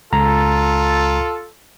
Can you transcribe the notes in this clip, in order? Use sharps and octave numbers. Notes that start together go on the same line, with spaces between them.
C#2 F4 A4 A#5